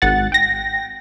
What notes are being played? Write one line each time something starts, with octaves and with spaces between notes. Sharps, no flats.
G#1 F#5 A6
G5 A#6